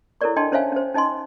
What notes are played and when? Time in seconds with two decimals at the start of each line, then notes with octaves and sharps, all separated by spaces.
0.21 E4 A4 A#4 C#5 D5 C#6
0.36 D4 D#5 G5 A5 C6
0.52 C#4 C5 C#5 E5 F5 G#5
0.72 C#4 C5
0.94 C#4 D#4 D#5 G#5 C6